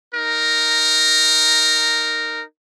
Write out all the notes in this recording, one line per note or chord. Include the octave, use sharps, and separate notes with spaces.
D#4 A#4